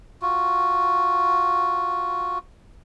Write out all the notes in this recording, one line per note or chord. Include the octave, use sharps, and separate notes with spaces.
F4 F#4